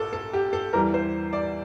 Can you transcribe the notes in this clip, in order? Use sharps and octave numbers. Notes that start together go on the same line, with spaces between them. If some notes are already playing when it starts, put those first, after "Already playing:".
Already playing: A#1 A#2 A4
A4
G4
A4
E2 E3 G3 A#4
C5
D5